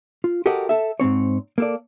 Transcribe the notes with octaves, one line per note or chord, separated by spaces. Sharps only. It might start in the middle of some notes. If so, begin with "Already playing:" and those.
F4
F#4 G4 A4 A#4 D#5 F#5
A4 E5
G#2 C#3 C4 C#5
A#3 A4 D5